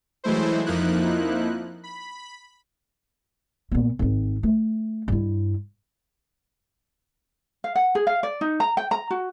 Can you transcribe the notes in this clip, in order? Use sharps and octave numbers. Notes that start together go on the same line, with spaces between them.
E3 F#3 G#3 A3 E4 C5
F2 F3 A#3 D#4 E4 F#6
B5
A#2 B3
G#1 C4
A3
G2 E4
F5
F#5
G#4
F5
D5
D#4
A#5
G5
A#5
F#4